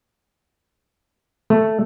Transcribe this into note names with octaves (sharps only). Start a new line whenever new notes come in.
A3